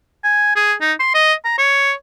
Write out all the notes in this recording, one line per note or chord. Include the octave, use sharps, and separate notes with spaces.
G#5
G#4
D#4
C6
D#5
A#5
C#5